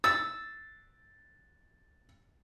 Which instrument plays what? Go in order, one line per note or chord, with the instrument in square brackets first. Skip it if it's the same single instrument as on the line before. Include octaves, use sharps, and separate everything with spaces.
[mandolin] E6 [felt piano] A6